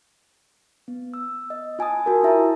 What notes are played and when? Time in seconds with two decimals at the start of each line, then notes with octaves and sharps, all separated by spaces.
0.88 B3
1.14 E6
1.50 D#5
1.79 F4 G#5 A5 D#6
2.06 F#4 A#4
2.23 E4 E5 A5 A#5